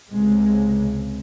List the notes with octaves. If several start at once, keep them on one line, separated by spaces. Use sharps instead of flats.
C#2 C3 G#3